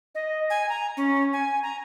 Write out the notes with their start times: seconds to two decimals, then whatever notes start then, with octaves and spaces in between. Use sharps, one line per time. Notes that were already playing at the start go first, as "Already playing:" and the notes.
0.15 D#5
0.50 G#5
0.69 A#5
0.97 C#4
1.33 G#5
1.63 A#5